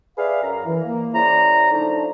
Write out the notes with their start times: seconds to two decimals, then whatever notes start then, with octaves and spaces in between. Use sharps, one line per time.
0.18 G#4 B4 D5 E5 F5
0.43 F#2 A#5
0.66 E3
0.84 A#3
1.14 C#3 E4 C5 D5 A#5
1.72 F3 A3 D4 D#4